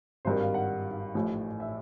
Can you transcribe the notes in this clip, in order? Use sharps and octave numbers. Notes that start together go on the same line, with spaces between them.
G#1 G2 D#3 C5
F5
F#5
A1 A2 F3
E5